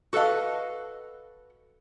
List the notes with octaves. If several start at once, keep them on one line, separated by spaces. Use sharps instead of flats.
F#4 A4 B4 D#5 F5